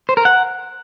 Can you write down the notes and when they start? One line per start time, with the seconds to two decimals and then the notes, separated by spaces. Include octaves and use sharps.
0.09 C5
0.17 A#4
0.25 F#5